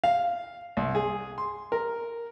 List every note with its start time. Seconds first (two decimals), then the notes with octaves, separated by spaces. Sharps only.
0.04 F5
0.77 C2
0.95 G#4
1.38 C6
1.72 A#4